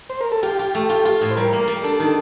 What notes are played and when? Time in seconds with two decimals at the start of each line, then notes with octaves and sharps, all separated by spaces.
0.10 C5
0.21 A#4
0.32 A4
0.43 F4 G4
0.59 F4
0.75 A3
0.89 F4
1.05 F4
1.21 A2
1.31 C5
1.36 G3 A#4
1.53 A#3
1.68 G3
1.84 D4 A4
2.00 D#3